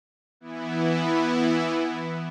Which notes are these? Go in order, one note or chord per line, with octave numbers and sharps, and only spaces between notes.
E3 B3 E4